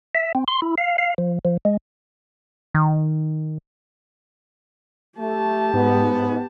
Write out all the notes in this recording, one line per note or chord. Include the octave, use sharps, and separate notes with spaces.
E5
C4
C6
E4
F5
F5
F3
F3
G#3
D#3
A3 G4 A5
G#2 B3